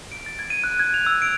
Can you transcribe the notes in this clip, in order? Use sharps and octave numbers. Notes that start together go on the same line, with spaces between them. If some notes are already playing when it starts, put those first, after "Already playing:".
D7
A6
G#6
D#7
F#6
G#6
F7
E6
D7